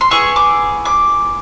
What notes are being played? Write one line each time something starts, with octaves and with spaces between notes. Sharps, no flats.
C6
B3 E4 G#4 C#6
D6
D6